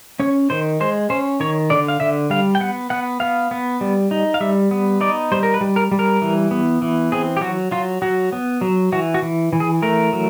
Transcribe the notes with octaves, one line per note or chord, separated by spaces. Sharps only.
C#4 C#5
D#3 C5
G#3 C5
C#4 C5
D#3 C#5
D3 D5
F5
D3 E5
G3 F5
G5
B3 F#5
B3 F#5
B3 F5
B3
G3
D#4
F5
G3 E5
B3
D#4 D5
G3 C5
A#4
B4
G3
A#4
G3
A#4
E3
B3
E3
C4 G#4
G4
F#3 F#4
F#3 F4
F#3 F#4
B3
F#3
E3 F#4
F#4
E3
E3
G#4
A3 A#4
F#3